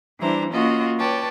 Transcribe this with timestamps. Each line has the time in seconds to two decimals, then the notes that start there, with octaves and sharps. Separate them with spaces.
0.19 E3 G3 D4 E4 C5 A#5
0.50 A#3 C#4 F4 F#4 D#5
0.97 B4 C#5 D5 G5 A5